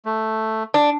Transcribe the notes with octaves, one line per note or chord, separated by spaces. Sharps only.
A3
D4